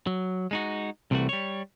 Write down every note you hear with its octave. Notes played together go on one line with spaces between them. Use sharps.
F#3
G#3 D#4 F#4
C2 C3 E3 G3 A3 F#4
G3 C#5